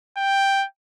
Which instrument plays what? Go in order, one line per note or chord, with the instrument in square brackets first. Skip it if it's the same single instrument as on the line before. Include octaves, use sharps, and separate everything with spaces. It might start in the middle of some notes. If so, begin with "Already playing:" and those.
[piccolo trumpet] G5